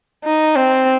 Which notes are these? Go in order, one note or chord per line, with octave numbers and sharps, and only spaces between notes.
D#4
C4